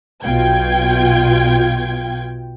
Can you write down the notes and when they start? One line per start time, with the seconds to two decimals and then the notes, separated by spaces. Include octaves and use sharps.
0.23 B1 B2 F4 G5 G#6